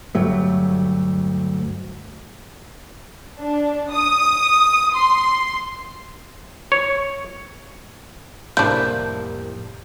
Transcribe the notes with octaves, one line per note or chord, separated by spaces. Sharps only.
D2 G2 F#3 A3
D4
D#6
C6
C#5
C2 F2 A2 A#3 D4 E4 C5 G6